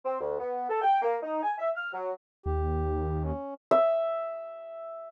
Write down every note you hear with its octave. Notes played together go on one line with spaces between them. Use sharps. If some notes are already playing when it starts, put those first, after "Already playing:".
C4
D2
B3
A4
G5
A#3
D#4
G#5
E5
F6
F#3
D#2 G4
C#4
E5